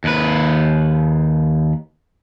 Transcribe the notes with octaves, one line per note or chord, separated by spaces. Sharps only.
D#2 B4